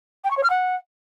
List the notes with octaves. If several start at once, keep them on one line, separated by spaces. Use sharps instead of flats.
G5
C#6
C#5
F6
F#5